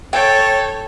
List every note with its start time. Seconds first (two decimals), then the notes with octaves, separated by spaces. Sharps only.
0.13 A4 C#5 G5